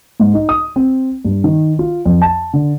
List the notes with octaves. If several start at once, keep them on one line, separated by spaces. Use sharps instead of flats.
G#2
D#4
D#6
C4
G2
D#3
F4
F2
A5
D3